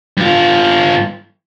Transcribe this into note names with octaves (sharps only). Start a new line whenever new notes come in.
G2 F4